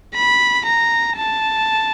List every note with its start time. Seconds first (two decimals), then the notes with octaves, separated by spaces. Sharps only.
0.15 B5
0.65 A#5
1.16 A5